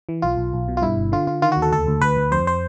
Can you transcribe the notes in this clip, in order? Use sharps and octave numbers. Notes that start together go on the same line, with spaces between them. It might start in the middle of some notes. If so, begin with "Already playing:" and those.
E3
B1 F4
B1
B1
B2
F4
G2 E4
G1
D3 F4
D3 F4
D#3 F4
F#4
D#2
A4
D2 A4
D2
D2 B4
D2
F2 C5
C5